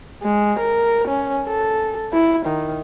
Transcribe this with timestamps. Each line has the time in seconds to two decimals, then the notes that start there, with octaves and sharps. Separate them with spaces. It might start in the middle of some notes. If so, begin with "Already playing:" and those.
0.23 G#3
0.59 A#4
1.08 C#4
1.46 A4
2.13 E4
2.46 D#3